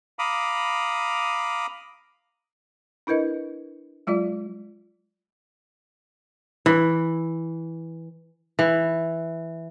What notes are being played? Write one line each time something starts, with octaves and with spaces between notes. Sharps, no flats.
F5 A#5 B5 D6 D#6
D4 E4 A#4 B4 D#5
F#3 G#3 F4 D5
E3
E3